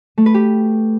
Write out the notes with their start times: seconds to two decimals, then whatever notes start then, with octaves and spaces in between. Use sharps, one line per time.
0.18 A3
0.26 B4
0.34 G4